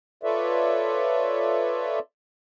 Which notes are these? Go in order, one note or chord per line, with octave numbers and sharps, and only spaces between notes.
F4 A4 B4 C#5 D5 E5